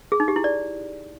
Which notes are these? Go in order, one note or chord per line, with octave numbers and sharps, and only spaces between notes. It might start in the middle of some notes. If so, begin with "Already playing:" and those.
G#4
D#4
G4
E4
D5